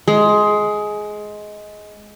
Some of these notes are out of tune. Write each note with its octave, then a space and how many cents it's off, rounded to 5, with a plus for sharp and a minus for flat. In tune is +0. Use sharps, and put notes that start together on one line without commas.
G#3 +15